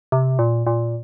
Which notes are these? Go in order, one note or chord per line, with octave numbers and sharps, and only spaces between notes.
C3
A#2
A#2